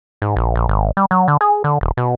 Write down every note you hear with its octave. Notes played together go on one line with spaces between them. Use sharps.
G#2
A#1
A#1
G#1
G3
F#3
D3
G#4
D3
D#1
B2